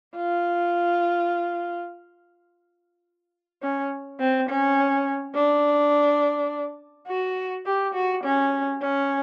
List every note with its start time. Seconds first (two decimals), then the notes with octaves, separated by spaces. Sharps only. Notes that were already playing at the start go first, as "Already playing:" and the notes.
0.16 F4
3.63 C#4
4.20 C4
4.49 C#4
5.35 D4
7.08 F#4
7.66 G4
7.94 F#4
8.24 C#4
8.81 C#4